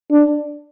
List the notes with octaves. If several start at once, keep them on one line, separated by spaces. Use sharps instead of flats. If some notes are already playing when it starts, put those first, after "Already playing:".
D4